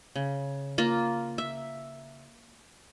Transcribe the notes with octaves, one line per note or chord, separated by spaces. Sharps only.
C#3
A#3 F4
E5